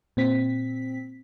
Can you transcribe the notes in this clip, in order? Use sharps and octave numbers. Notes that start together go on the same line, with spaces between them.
A#2 C4 B6